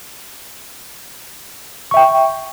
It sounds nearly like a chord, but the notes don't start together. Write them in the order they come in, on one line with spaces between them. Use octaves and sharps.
C#6 E5 G5